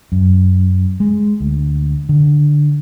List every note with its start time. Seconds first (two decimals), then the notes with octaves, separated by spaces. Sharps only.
0.12 F#2
1.00 G#3
1.40 D2
2.09 D3